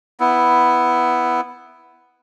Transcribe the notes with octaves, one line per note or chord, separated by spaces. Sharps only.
B3 E4